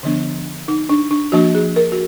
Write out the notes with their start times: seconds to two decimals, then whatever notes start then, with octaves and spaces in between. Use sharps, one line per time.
0.03 D3 F3 B3 D4
0.68 D#4
0.89 D4
1.11 D4
1.32 F3 A#3 D4 F#4
1.55 G#4
1.76 A#4
1.92 F#4